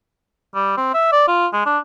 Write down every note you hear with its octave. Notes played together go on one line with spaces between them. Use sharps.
G3
C4
E5
D5
F4
G#3
D4